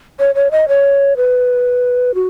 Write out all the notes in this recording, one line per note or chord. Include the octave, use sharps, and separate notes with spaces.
C#5
C#5
D#5
C#5
B4
F#4